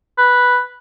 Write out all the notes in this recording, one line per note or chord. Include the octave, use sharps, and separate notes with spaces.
B4